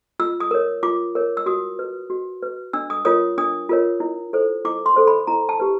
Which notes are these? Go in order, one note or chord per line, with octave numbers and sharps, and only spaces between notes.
F4 E6
D#6
A#4 C#5
F4 D6
A#4 C#5
E6
F#4 D#6
B4
F#4
B4
D4 E6
D#6
F4 A#4 C#5 D#6
D4 D#6
F4 A#4 C#5
E4
A4 C5
E4 D6
C6
A4 C5
B5
E4 A#5
A5
G4 B4